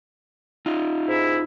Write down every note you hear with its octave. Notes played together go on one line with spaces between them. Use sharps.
D#4 F4
G#2 E4